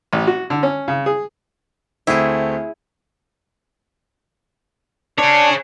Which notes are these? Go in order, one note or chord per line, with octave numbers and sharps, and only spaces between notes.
A1
F#4
D3
C#4
C#3
G#4
D2 A3 C4 E4 G#4
D4 G#4 C#5